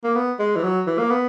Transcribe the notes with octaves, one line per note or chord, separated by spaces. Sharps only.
A#3
B3
G#3
E3
F#3
E3
A#3
B3